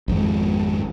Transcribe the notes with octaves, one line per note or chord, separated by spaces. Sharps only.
G#1 F2 G#2